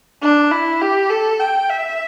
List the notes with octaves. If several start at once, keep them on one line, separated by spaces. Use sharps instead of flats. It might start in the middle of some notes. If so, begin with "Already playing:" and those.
D4
E4
G4
A4
G5
E5